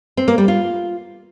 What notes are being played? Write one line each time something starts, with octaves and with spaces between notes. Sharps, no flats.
C4
A#3
G3
F4